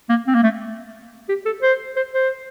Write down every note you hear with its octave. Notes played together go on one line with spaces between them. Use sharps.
A#3
C4
A#3
A3
G4
A4
C5
C5
C5